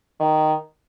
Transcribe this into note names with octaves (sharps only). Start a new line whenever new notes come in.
D#3